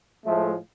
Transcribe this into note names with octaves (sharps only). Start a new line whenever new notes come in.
A2 F3 G#3 A3